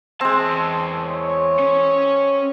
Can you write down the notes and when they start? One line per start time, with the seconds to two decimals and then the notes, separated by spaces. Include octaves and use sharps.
0.21 E2 G#3 C4 A5
1.03 C#5
1.60 C#4